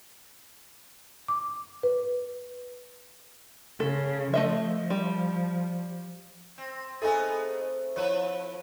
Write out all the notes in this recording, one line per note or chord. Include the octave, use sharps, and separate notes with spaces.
D6
B4
C#3 A4
F3 A3 D#5 E5
G3
C4
A3 B3 C4 D#4 G#4 A4 G#5
F3 E4 B4 C#5